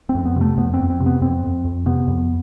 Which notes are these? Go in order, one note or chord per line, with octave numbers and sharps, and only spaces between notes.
C4
F2
B3
C3 A3
F2 B3
C4
F2
C4
C3
B3
F2 C4
F2
F2
C3 B3
F2